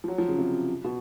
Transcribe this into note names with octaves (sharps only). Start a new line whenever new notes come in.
F3
F#3
F3
C#3
C3
B2